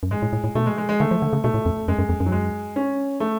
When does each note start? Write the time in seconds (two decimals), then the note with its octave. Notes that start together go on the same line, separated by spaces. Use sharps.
0.03 F#2
0.11 G#2 G#3
0.22 A2
0.33 A2
0.44 A2
0.55 B2 A3
0.66 G#3
0.78 G#3
0.89 G#3
1.00 D3 A3
1.11 F3
1.22 D3
1.33 C#3
1.44 B2 A3
1.54 A2
1.66 F2
1.88 F#2 G#3
1.99 F#2
2.09 F2
2.20 F#2
2.26 F#3
2.32 G#3
2.76 C#4
3.20 A3